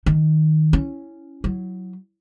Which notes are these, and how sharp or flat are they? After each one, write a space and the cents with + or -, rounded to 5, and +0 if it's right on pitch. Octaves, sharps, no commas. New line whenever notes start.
D#3 +0 D#4 +0
C#4 +0 E4 +0
F#3 +0 E4 +0